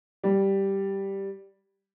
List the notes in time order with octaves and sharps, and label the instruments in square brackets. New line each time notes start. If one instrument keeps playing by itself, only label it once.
[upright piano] G3